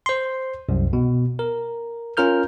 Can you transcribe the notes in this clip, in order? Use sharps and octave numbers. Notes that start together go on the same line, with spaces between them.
C5 C6
C2 F#2
B2
A#4
C#4 F4 A#4 F6 G6